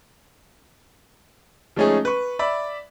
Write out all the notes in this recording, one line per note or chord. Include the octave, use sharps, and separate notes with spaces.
F3 G#3 A3 C#4 D#4 G#4
B4 C#6
D5 E5 B5